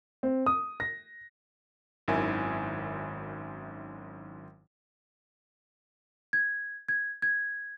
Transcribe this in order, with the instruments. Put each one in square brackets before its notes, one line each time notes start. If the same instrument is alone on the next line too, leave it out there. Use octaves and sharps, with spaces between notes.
[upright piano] C4
D#6
A#6
[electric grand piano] G#1 F#2 D#3 E4 E5 G#5
[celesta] G#6
G#6
G#6